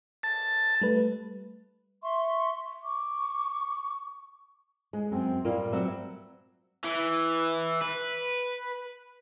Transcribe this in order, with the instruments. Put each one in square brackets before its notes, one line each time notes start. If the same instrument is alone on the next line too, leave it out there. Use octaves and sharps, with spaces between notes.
[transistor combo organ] A5
[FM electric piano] G3 A3 B4
[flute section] E5 C6 C#6
C#6 D6
[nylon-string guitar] G#3
[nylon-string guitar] F#2 [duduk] C4
[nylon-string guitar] A#2 A#3 F4 [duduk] G3
[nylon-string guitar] F#3 C4 E5
[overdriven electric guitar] E3
B4